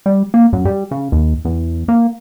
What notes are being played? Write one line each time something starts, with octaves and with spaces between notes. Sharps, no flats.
G3
A#3
F#2
G3
C#3
D#2
E2
A#3